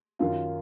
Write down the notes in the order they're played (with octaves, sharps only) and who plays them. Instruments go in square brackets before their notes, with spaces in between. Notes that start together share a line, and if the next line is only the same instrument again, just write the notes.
[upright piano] F#2 D#3 F#3 F4